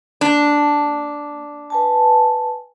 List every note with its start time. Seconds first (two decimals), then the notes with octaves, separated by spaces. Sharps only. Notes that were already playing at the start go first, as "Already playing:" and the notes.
0.21 A#3 D4
1.70 B4 G#5 A5